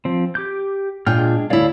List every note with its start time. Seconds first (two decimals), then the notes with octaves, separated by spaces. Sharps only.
0.05 F3 C4
0.35 G4 D6 G6
1.07 A#2 G#3 D4 F4 G5 F6
1.50 D2 E4 C#5 D5 F5